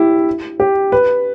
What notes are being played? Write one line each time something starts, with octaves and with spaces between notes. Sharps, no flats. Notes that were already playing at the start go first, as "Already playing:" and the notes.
Already playing: E4 G4
G4
B4